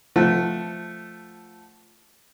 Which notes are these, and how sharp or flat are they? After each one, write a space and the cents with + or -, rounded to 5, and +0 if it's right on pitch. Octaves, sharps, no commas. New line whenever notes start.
F3 +0 A3 +0 F#5 +0